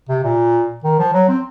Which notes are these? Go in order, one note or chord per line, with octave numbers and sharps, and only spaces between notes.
C3
A#2
D#3
F3
F#3
C4